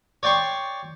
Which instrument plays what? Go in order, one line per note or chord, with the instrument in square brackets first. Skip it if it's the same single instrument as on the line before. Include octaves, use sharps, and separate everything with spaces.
[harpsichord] C#5 D5 G5 C6 C#6